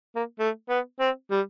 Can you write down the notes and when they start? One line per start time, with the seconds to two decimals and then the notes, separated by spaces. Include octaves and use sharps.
0.16 A#3
0.39 A3
0.69 B3
1.00 C4
1.31 G3